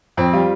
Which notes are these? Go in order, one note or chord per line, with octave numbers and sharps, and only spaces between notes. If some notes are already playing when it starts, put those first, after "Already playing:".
F2 C4
G3 F4